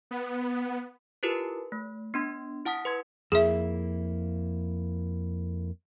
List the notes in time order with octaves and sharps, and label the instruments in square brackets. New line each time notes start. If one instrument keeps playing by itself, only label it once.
[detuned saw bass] B3
[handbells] E4 F4 G4 A#4 B4
A3
B3 D4 C6
E4 F#5 A5 D#6 B6
B4 C6 G#6
[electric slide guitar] F2 A#3 E4 [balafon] G#4 E5